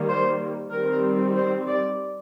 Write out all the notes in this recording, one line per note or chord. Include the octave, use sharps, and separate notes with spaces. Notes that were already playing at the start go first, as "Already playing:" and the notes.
Already playing: D#3 G3 A#3
C5
D#3 G3 C4 A#4
C5
D5